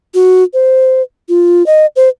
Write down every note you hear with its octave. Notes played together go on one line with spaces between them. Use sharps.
F#4
C5
F4
D#5
C5